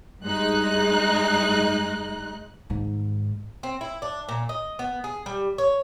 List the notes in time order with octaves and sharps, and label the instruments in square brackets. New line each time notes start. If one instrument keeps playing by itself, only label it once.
[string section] G2 G#3 D#4 F#6
[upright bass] G#2 D#3
[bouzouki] C4
E4
D4
A#2
D#5
B3
G#4
G3
C#5